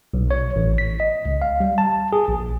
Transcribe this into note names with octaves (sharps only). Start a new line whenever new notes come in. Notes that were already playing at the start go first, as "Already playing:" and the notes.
B1
C#5
A1
B6
D#5
C#2
F5
G3
A5
G#4
A#1